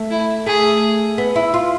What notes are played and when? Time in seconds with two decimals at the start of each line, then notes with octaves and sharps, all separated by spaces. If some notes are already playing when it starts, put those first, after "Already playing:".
Already playing: A3
0.11 E4
0.47 A3 G#4
1.18 B3
1.36 E4
1.54 F4